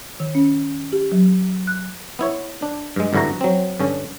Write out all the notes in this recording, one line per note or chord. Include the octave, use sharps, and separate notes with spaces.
D#3
C#4
G4
F#3
F#6
B3 E4 C#5
D4
G2 G#3
G#1 G2 D3 E4 F#4 A#5
F#3 C4
G2 D3 C#4